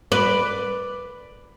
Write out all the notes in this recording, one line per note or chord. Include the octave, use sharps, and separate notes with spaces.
B4 D5